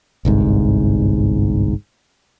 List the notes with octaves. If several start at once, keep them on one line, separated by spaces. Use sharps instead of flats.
G1 C2 G#2